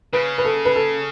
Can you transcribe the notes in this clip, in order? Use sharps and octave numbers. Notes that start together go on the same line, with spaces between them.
C#3 B4
B4
A4
B4
A4